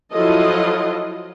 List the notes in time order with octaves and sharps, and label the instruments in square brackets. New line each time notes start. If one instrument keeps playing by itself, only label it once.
[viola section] F3 F#3 E4 F4 A4 D#5